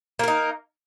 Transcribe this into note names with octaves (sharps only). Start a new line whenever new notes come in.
A#3 D#4 A#4